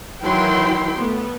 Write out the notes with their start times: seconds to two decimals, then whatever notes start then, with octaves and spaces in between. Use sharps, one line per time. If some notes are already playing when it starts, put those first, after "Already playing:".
0.23 D#3 E3 F#3 E4 G5 C6
0.97 A3 B3